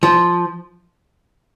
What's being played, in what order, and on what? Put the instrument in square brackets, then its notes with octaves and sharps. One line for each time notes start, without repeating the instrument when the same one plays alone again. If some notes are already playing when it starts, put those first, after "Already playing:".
[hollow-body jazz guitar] F3